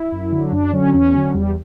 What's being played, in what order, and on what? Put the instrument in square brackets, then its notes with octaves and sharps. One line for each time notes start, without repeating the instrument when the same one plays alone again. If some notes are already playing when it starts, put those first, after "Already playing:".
Already playing: [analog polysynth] E4
F#2
D3 F#3
F#2 D4
D3 F#3 C#4
E2 C#4
D3 F#3
E2 G3